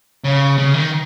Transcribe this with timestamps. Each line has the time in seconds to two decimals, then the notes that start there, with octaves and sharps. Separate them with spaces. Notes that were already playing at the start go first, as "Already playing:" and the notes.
0.24 C#3
0.58 C#3
0.74 D#3